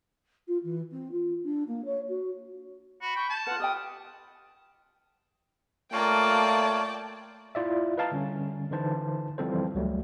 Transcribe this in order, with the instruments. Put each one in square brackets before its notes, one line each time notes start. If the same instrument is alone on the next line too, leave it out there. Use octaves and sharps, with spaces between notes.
[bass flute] F4
E3
C4
F4
D4
A#3
C#5
F#4
[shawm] F#4 [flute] B5
[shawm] G5 [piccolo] C#6
[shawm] A5 [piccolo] G6
[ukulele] F4 B4 [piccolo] F#5 [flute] F6
[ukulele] G4 D#5 G5 [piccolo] D#6
[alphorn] A3 [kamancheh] A#3 [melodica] F4 C#5 [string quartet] D5 G5 A5
[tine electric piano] E4 F4 D5 E5
B4 D#5 F5 A5 A#5
D3 G3 C#4
D3 E3 D#4 B4 C5 A5
E3 F3 G3 C4 A4 C5
C#2 F#3 G3 A3